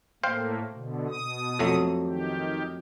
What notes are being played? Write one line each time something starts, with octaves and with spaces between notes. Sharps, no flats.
A2 A3 A#3 C5 F5 G5
B2 D3
B2 D#6
F2 F#3 A3
D#3 G4